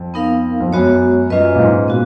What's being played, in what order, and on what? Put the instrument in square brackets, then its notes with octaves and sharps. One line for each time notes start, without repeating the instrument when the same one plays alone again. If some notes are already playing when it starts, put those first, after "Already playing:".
Already playing: [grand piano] F2
[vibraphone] B3 D#4 A#4 F5
[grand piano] F2
[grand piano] F#2 [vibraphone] G#3 B3 F#4 C#5
[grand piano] F#2 [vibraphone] G#3 C#4 F4 B4 D#5
[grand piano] A#2
G#2
[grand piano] A#2 [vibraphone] B3 F#4